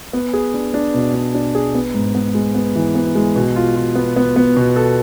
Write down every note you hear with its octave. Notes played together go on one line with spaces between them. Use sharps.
B3
G#4
D4
D4
B2
D4
D4
G#4
B3
G#2
B3
G#3
B3
E3
B3
G#3
B2
F4
F4
B3
B3
B3
B2
A4